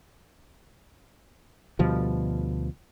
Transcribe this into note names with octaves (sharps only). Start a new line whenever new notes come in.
D2 B2 F3 G3